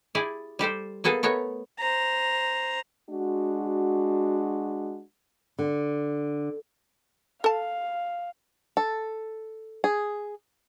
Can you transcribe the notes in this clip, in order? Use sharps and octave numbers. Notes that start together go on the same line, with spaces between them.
E4 G4 G#4 D5
G3 G4 A4 C5
A#3 B3 G#4 A4 G#5
A3 B3 A#4 C#5 E5
C5 A#5
G#3 D4 F#4
D3
A4 F5 A5
A4
G#4